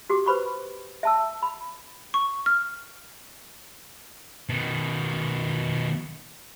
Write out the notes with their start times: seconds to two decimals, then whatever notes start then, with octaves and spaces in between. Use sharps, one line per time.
0.10 F#4 G4 D6
0.26 B4 C5 B5 C#6
1.03 E5 A5 E6
1.42 B5
2.14 C#6
2.46 F6
4.49 B2 D#3